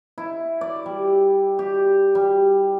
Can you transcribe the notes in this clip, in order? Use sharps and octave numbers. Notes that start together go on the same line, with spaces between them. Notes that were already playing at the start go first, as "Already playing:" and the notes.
E4
D5
G3
G4
G3